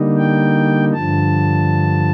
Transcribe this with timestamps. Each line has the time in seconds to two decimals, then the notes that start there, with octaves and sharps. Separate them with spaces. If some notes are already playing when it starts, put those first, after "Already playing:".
Already playing: D3 G3 A#3 D#4
0.18 G5
0.94 G2 D3 F3 A5